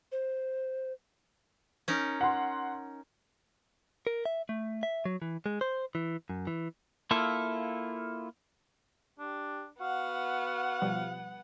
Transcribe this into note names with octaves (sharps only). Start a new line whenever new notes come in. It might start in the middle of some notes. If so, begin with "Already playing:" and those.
C5
C#4 D#4 A#4
F#5 C6
A#4
E5
A3
E5
F#3
E3
G#3
C5
E3
F#2
E3
A#3 E4 F4 A4 E5
D4 G4
B3 F#4 F5 F#5
B2 F3 G3